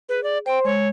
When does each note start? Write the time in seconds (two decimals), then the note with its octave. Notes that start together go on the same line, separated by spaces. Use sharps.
0.09 G#4 B4
0.23 D5
0.46 C5 G5 C6
0.65 G#3 C#5